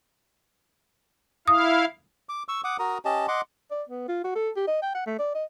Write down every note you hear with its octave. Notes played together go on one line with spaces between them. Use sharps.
E4 F5 D#6
D6
C#6 E6
F#5 D6 D#6
F#4 A#4 A#5 D#6
C#4 G4 D#5 A5
D#5 F#5 C6 D6
D5
B3
F4
F#4
A4
G4
D#5
G5
F#5
A3
D5
D#5